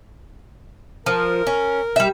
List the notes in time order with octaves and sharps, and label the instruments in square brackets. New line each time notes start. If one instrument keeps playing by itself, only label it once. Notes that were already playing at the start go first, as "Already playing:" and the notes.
[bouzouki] F3 [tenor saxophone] A#4
[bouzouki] C#4
G3 E5